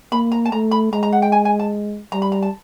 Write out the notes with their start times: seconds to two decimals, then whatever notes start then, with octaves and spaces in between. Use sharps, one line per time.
0.12 A#3 B5
0.32 A#5
0.46 A5
0.52 A3 A#5
0.71 B5
0.92 G#3 A#5
1.03 A#5
1.13 F#5
1.22 G5
1.32 G#5
1.45 G#5
1.60 A5
2.12 G3 A#5
2.22 B5
2.32 A#5
2.42 A5